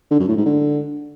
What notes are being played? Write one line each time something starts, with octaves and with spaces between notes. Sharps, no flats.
D3
F#2
A2
G#2
D3